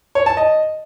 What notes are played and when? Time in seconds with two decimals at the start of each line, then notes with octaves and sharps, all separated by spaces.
0.15 C#5
0.26 A5
0.37 D#5